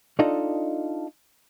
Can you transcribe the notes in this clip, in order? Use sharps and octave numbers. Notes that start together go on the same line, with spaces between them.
D4 D#4 F4 A4 D5 D#5